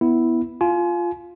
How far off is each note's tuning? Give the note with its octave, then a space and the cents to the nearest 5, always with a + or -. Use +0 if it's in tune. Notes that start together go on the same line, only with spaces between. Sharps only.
B3 +0 E4 -5
F4 +0 G#5 +35